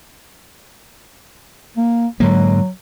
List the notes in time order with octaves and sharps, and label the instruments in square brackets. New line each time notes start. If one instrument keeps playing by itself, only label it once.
[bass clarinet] A#3
[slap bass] G#2 D3 A#3 [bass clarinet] F#3